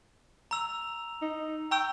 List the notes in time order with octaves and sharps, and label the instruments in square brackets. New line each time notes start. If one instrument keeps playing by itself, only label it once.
[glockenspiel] A#5 E6 F7
[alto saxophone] D#4
[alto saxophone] G5 [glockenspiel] A#5 C#6 E6